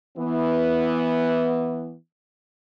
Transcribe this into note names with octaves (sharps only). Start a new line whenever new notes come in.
E3 B3